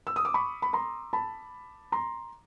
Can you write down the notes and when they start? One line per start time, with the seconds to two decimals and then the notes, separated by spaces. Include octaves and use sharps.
0.07 E6
0.16 D#6
0.25 D6
0.34 B5 C#6
0.62 B5
0.73 A#5 C6
1.13 A5 B5
1.92 A#5 C6